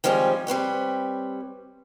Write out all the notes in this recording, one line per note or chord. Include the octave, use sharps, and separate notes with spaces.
D#3 F3 G3 G#3 C4 C#4
G3 C4 B4 C#5